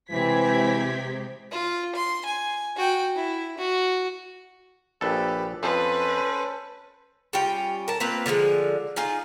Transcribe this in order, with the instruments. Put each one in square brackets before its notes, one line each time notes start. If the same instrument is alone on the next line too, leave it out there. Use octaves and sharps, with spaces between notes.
[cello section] C3 G#3 G4 [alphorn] E3 [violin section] C4 G#6 B6
[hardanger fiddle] F4
C6
G#5
F#4 G5
E4
F#4
[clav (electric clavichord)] A#1 A4 [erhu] G4 [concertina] B4
[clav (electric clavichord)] F2 [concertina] C#4 A4 C5 [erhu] B4
[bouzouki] G3 C#4 F4 G5
A#4 A5
A#3 C4 F4 B4
D3 F3 G3 G#3
D#4 F4 G#4 F5